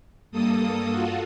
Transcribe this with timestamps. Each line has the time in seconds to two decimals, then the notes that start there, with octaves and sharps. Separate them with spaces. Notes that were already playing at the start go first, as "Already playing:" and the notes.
0.32 G2 A#3 A4 D#6
0.88 F4 F#4 A4